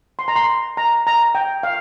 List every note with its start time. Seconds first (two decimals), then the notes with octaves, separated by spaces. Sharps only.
0.19 C6
0.28 A#5
0.36 C6
0.77 A#5
1.07 A#5
1.35 G5
1.63 F5